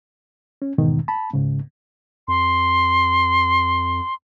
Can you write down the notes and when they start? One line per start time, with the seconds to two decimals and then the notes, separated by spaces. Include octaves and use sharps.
0.62 C#4
0.78 E2 G#2 B2 D#3
1.08 A5 B5
1.33 C#2 G#2 C#3
2.28 F2 C6